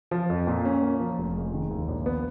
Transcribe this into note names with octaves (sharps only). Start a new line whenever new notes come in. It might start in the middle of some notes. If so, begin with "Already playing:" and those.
F3
F2
A#2
C#4
A#3
F3
F1
G#3
D#3
D#2
A#1
B3